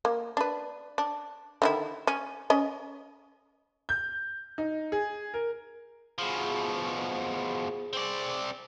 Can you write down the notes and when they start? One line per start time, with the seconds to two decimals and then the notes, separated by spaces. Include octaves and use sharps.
0.05 A#3
0.37 D4 B4
0.98 D4
1.62 D3 D#3 E4
2.07 C#4
2.50 C#4 D#5
3.89 G6
4.58 D#4
4.92 G#4
5.34 A#4
6.19 B2 F3 G#4
7.93 C4 D5